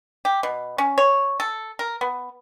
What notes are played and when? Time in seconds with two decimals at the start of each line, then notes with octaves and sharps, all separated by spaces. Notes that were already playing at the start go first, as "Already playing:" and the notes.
0.25 G4
0.43 B2
0.78 C#4
0.98 C#5
1.40 A4
1.79 A#4
2.01 B3